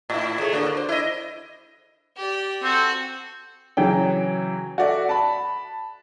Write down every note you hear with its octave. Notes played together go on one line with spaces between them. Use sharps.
A2 E4
A3 G#4 C#5
D3 A#3 F#4
C5
E4 D#5
G4 D5
C4 F#4 A4
C#3 E3 F#3 G5
F#4 A4 D5 E5
A5 B5